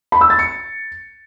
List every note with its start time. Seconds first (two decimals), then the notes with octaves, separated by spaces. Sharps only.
0.12 B5
0.21 E6
0.30 A6
0.39 C#7